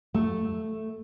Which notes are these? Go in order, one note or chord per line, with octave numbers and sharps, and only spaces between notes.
A3